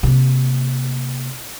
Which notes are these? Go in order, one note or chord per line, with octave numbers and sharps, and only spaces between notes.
C3 A#3